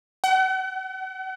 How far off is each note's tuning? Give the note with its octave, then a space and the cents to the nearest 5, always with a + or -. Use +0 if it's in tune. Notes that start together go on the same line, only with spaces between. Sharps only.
F#5 +40